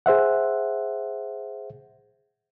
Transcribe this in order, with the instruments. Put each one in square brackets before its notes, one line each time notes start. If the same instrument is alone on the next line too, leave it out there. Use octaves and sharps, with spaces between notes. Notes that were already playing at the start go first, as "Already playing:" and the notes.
[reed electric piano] G#4 C5 E5 F#5